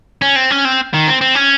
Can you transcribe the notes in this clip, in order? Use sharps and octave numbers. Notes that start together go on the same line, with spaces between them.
C#4
C4
C#4
C4
D#3
C4
C4
C#4